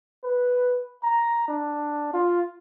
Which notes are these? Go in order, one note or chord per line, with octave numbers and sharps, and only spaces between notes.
B4
A#5
D4
F4